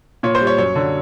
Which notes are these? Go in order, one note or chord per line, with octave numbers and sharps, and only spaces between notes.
A#2 C#5
C5
G3
C#5
F#2 C#5
D3 F#3